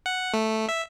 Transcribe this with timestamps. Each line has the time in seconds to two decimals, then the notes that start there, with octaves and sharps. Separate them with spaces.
0.06 F#5
0.33 A3
0.69 E5